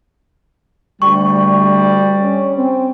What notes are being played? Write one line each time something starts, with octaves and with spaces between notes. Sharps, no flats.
D2 G3 C#6
C#4
C4